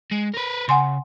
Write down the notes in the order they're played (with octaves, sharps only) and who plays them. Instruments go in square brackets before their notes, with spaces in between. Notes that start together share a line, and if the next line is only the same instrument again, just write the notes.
[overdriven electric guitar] G#3
A#4 B4
[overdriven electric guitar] C#3 [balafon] F#5 G#5 C6